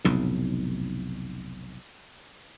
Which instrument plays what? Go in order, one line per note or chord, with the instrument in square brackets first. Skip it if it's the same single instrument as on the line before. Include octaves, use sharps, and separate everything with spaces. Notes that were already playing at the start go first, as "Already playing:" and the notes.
[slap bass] F1 B1 A2